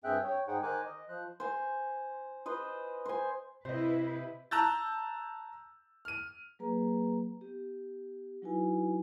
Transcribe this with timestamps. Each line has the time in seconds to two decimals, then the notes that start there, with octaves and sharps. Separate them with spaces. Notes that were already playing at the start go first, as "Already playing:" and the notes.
0.04 G2 C4 G#4 E5 G5 F#6
0.24 C#5 G5
0.48 G#2 D#4 G#4 C5 F#5 G5
0.63 D#3 A#4 C5 G#5 D6 F#6
0.85 D#5
1.08 F3 C5 F#6
1.40 C5 G#5
2.46 B4 C5 D#5
3.06 C5 G#5
3.65 C3 E4 B4 C5 D#5
4.51 A5 A#5 E6 F#6 G6 A6
6.05 F6 D#7
6.59 F#3 A#3 G#4 B4 A#5
7.41 B3 G4
8.42 F#3 D#4 E4 F#4 B4 G#5